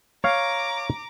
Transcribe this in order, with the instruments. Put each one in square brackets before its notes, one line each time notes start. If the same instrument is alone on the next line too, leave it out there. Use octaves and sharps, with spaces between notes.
[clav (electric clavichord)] C#5 F5 [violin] A#5 D6